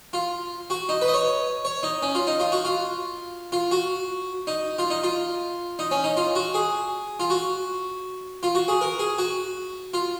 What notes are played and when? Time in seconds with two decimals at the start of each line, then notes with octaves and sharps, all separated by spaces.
0.13 F4
0.70 F#4
0.89 D#4
1.02 B4
1.08 D#5
1.14 C#5
1.65 C#5
1.83 D#4
2.02 C#4
2.15 F4
2.27 D#4
2.40 F4
2.52 F#4
2.65 F4
3.52 F4
3.71 F#4
4.47 D#4
4.79 F4
4.90 D#4
5.03 F4
5.79 D#4
5.91 C#4
6.04 D#4
6.17 F4
6.35 F#4
6.54 G#4
7.20 F4
7.30 F#4
8.43 F4
8.55 F#4
8.68 G#4
8.81 A#4
8.99 G#4
9.18 F#4
9.94 F4